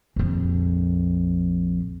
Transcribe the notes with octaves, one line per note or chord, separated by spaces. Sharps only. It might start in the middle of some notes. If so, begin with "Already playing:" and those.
A#1 F2